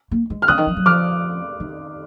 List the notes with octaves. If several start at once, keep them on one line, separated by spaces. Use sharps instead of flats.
A#3
G#3
F6
D3 D#6 F#6
D#3
F3
F#3
F3 D6 F6
D#3